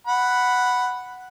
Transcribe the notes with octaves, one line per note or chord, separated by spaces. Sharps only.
F#5 B5